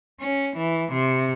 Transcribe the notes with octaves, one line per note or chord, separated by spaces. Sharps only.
C#4
E3
C3